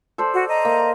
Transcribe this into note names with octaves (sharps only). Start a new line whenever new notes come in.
A4 C5 D5
F#4
D#5 A#5
A#3